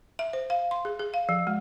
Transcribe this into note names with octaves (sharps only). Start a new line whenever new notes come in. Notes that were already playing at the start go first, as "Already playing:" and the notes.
E5
C5
F5
C6
G#4
G#4
F5
F3
G#3